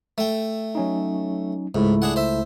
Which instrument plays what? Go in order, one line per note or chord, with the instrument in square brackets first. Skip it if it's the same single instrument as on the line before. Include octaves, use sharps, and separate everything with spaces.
[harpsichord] A3 G5
[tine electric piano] F#3 C#4 D#4
[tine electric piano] C#2 A3 E4 [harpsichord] G#2
[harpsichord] D4 G#4 F#5
C5 E5